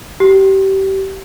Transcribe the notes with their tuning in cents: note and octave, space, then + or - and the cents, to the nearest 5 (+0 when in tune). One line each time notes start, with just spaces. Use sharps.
G4 -25